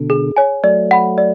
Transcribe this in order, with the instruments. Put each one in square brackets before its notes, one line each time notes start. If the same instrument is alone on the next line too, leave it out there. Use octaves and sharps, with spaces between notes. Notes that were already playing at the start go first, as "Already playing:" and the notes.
Already playing: [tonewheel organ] B2 D3
[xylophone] G#4
C#5 G#5
[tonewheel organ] F#3 A3 [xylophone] D5
[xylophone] F#5 B5
D5